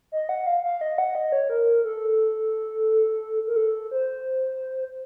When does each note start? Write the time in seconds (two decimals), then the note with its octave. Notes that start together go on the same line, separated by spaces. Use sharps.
0.12 D#5
0.29 F#5
0.47 F5
0.64 F5
0.81 D#5
0.98 F#5
1.15 D#5
1.32 C#5
1.50 A#4
1.84 A4
3.47 A#4
3.56 A4
3.91 C5